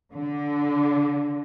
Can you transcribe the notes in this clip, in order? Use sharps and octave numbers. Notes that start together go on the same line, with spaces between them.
D3